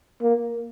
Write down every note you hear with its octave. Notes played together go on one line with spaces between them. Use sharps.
A#3